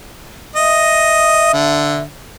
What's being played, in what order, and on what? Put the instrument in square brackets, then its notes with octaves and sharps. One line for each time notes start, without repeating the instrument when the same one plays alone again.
[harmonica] D#5 [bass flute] E5
[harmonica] D3